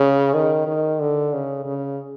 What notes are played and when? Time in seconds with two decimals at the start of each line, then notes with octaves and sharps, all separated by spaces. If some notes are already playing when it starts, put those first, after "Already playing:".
Already playing: C#3
0.34 D#3
0.67 D#3
1.00 D3
1.33 C#3
1.66 C#3